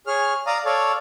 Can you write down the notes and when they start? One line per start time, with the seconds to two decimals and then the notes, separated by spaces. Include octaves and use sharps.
0.07 G#4 C#5 F6
0.47 D5 F5 A#5 D#6
0.65 A4 C#5 D5 F5